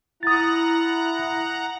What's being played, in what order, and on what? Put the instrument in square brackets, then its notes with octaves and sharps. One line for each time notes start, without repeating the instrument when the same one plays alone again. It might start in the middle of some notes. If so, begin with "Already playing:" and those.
[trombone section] E4 [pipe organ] F#5 A#5 [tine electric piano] D#6 A6